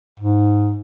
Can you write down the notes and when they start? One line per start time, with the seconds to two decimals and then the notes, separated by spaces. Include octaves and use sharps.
0.19 G#2